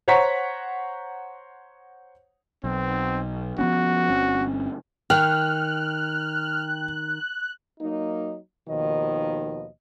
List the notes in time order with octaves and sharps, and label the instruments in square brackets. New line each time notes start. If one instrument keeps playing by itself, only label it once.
[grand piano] C5 C#5 F#5 A#5 C#6 B6
[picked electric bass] B1 [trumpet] C4
[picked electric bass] F3 B3 C#4 [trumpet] F#4
[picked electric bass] G1 C4 C#4
[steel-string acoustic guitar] D#3 [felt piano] G5 [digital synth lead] F6 [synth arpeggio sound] F#6
[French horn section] F#3 A#3 D#4
D#2 B2 D#3 F3 D#5